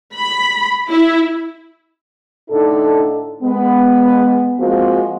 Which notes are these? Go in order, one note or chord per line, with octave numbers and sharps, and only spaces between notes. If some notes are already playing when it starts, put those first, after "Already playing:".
B5
E4
A2 D3 D#4 A4
G#3 B3
F3 G#3 A#3 C4 F#4